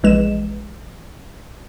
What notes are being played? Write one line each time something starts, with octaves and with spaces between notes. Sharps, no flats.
A#1 E3 G#3 E7